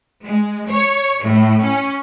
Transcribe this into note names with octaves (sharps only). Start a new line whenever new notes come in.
G#3
C#5
A2
C#4